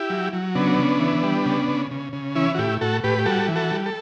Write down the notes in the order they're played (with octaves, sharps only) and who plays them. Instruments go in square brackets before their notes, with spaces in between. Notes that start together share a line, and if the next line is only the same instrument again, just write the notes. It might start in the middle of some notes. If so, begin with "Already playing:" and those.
Already playing: [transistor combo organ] E4 G4
F#3
F#3
C#3 B3 D4
C#3
E3
G3
C#3
C#3
C#3
C#3
E3 C#4 E4
F#4
A2 E4 G4
A2 F#4 A4
A2 G4 B4
G4
G3 F#4 A4
E3
F#4 A4
G3
A4